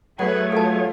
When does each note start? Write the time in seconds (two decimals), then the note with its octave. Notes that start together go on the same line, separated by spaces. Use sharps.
0.19 F#3 A3 G#4 B4 C#5 F#5
0.52 F4 A4 A5